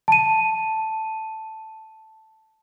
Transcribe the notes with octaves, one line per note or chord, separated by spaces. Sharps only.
A5 D#7